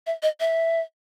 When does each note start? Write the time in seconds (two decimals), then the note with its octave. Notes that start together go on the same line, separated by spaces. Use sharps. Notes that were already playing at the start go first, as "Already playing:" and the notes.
0.07 E5
0.22 D#5
0.40 E5